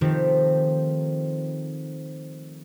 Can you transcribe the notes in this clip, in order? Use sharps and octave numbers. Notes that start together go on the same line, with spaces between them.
D#3 F3 A3 C4 G4